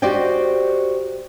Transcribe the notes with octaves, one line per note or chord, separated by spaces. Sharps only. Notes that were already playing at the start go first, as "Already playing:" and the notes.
F#4 G4 C5 D5 D#5 G5